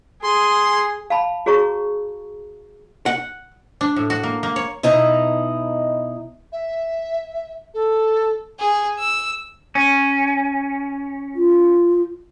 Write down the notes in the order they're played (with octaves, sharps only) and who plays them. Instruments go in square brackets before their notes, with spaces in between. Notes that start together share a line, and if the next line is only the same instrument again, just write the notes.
[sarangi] G#4 [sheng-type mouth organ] C6
[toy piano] F5 A5 B5
F#4 G#4 C#5 A#5 C#6
[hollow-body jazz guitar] F#5
[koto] D4
A2
F#4
A#3
A#3
C#5
[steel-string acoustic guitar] B2 D#4 E4 A#5
[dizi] E5
A4
[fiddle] G#4
E6
[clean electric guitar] C#4
[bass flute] F4